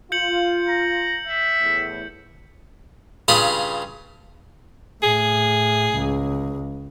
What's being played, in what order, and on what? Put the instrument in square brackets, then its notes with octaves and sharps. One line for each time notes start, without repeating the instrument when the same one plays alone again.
[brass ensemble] F4 [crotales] G6 C#7 F#7
[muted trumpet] A#5
E5
[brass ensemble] E2 A2
[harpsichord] G2 C#3 F4 B5 D#6
[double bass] A2 [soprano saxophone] G#4
[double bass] C#2